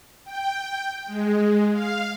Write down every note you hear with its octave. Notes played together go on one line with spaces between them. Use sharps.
G5
G#3
F5